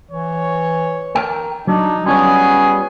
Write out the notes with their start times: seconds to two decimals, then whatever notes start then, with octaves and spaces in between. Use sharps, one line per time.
0.11 E3 C#5
1.16 A#4 G5
1.67 F#3 D4 D#4
2.06 G3 B3 C#4 F4 G#4 C#5